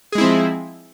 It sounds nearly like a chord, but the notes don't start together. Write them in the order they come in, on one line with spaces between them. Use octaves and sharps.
G#4 G#3 E4 C4 F3